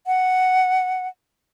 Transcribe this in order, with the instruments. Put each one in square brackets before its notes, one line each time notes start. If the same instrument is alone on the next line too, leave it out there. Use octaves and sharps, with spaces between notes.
[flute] F#5